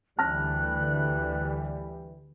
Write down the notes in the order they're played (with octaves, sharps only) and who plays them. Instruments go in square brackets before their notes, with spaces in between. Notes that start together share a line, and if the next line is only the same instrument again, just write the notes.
[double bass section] D2 [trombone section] E3 G3 [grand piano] A5 F6 A#6 [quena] F#6